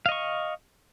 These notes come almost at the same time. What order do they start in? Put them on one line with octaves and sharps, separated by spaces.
F5 D#5 C#6